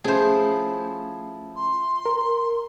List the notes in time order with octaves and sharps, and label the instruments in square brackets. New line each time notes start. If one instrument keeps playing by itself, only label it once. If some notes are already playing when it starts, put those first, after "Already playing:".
[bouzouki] F3 E4 [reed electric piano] A3 C#4 [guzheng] G#4 C5
[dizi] C6
[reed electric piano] A#4